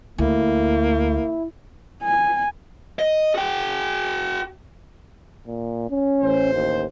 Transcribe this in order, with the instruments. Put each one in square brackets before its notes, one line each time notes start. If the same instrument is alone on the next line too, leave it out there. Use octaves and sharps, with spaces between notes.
[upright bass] D2 [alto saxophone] A#3 [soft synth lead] E4
[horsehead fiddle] G#5
[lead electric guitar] D#5
F#4 G5
[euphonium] A#2
C#4
[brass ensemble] A1 C5
[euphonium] D#2